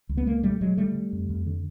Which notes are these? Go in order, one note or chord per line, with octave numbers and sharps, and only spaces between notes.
C#2
B3
C#2 G#3 A#3
B2 G3 A3
B2 F#3 G#3
D3 G3 A3
D3
F2
F2
D3